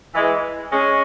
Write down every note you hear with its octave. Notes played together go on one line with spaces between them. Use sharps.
E3 G#3
G#3 C#4